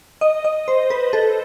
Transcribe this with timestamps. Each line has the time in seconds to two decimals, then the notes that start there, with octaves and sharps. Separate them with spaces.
0.21 D#5
0.45 D#5
0.68 C5
0.90 B4
1.13 A4